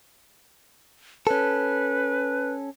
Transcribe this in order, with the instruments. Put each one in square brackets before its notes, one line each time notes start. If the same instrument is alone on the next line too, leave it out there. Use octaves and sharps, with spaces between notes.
[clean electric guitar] C#4 A4 [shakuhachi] B4